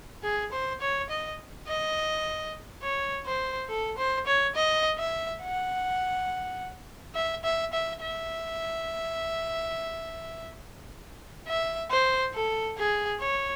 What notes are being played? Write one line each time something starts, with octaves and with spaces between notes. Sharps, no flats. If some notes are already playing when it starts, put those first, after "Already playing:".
G#4
C5
C#5
D#5
D#5
C#5
C5
A4
C5
C#5
D#5
E5
F#5
E5
E5
E5
E5
E5
C5
A4
G#4
C#5